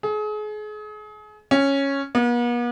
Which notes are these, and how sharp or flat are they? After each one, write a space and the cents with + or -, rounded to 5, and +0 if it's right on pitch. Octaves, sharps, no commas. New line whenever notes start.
G#4 +35
C#4 -5
B3 -45